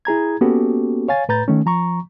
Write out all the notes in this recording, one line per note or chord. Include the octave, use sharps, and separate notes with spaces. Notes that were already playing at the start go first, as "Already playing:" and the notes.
E4 G#4 A#5 G#6
A#3 B3 C#4 F#4 G4 A4
C#5 F5 G#5 A6
A2 B4 A#5 G6 A6
D#3 A3 C#4
F3 A#5 C#6